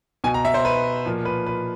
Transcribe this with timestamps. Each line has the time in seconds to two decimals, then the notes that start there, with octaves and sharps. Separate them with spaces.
0.24 B2 G#5
0.34 A#5
0.45 E5
0.54 C5
0.65 B4
1.05 A#2 F3
1.25 B4
1.46 B4